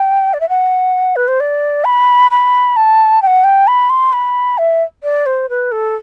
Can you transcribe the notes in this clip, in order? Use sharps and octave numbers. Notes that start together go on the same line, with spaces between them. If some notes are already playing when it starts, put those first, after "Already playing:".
Already playing: G5
D5
E5
F#5
B4
C5
D5
B5
B5
A5
G5
F#5
G5
B5
C6
B5
E5
D5
C5
B4
A4